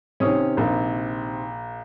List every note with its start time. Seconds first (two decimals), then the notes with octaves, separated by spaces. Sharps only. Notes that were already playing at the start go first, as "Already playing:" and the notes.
0.20 C3 D#3 C#4 D#6
0.57 A#1